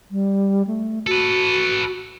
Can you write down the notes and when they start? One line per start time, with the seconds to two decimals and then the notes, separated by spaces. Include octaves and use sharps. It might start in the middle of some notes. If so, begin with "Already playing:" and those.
0.11 G3
0.67 A3
1.07 F#4 A4 B4